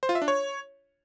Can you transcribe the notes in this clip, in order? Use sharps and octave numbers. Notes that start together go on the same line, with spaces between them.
C5
F4
E5
D4
C#5